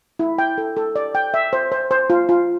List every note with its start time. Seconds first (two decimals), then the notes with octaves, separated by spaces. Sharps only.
0.19 E4
0.38 G5
0.58 A4
0.77 A4
0.96 D5
1.15 G5
1.34 E5
1.53 C5
1.72 C5
1.91 C5
2.10 F4
2.29 F4